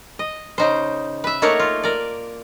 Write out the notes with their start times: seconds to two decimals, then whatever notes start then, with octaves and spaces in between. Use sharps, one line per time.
0.19 D#5
0.58 C#3 D#4 C5
1.24 B4 E5
1.42 A3 A#3 D#4 A#4 C#5 F#5
1.59 F4
1.83 A#4 D5